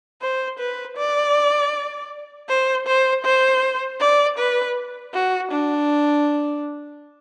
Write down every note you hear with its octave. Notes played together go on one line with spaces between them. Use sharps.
C5
B4
D5
C5
C5
C5
D5
B4
F#4
D4